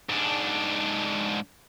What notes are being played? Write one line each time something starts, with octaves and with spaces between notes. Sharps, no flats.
G#2 D4